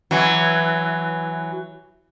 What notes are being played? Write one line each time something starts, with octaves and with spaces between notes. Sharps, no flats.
E3 F#3